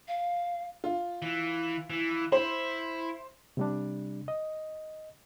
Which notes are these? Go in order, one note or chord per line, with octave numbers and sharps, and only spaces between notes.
F5
F4
E3
E3
E4 C5
C3 G3 D4
D#5